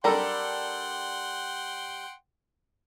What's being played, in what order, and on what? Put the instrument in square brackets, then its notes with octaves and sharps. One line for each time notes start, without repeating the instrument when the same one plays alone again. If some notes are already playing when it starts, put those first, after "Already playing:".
[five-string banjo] G3 A#4 [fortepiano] D4 A4 B5 [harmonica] F#5 G5 C6